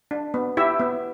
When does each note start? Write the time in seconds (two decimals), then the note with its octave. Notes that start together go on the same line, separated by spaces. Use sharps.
0.11 D4
0.34 B3
0.57 E4 G4 E5
0.80 B3